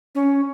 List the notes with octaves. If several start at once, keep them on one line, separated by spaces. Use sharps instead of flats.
C#4